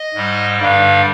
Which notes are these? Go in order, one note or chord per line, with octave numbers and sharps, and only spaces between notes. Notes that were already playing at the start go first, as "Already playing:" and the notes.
Already playing: D#5
G#2 G3
G2 D3 G3 F5